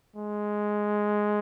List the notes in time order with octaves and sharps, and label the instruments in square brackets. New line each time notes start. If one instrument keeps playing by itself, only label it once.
[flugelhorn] G#3